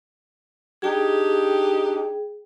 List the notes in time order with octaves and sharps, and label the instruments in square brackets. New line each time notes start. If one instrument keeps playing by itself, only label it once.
[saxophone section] D4 D#4 G4 [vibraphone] G#4 G5